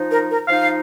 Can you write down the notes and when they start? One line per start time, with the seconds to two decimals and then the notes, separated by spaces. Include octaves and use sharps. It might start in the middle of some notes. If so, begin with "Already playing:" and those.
Already playing: F3 D#4
0.10 A#4
0.29 A#4
0.48 F3 D#4 F5